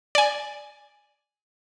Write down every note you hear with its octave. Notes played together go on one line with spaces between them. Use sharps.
D5 G#5